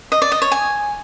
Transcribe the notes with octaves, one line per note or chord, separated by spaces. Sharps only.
D#5
D5
D#5
C#5
G#5